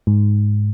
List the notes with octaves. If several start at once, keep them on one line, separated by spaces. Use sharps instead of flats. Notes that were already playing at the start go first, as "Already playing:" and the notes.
G#2